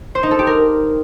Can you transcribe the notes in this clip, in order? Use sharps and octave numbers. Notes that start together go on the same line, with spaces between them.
C5
D#4
A4
G4
A#4